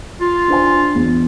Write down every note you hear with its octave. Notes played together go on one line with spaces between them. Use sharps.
F4
D4 C5 G#5
E2